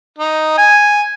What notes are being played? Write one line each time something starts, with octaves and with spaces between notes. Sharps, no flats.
D#4
G#5